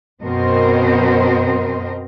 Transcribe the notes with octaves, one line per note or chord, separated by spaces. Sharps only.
F#2 B2 C4 A#4 C5 D#5